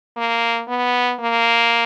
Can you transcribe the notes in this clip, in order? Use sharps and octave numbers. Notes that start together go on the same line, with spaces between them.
A#3
B3
A#3